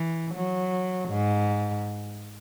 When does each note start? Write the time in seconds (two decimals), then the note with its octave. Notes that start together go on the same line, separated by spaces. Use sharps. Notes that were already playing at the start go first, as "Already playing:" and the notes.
Already playing: E3
0.35 F#3
1.09 G#2